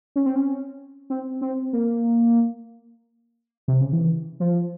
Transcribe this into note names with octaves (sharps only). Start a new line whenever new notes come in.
C#4
C4
C#4
C4
C4
A#3
C3
C#3
E3
F3